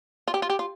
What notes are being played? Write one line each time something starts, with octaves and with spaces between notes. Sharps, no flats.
F4
G4
F4
G4
F4